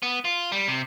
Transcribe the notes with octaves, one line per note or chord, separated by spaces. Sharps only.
B3
F4
G3
C3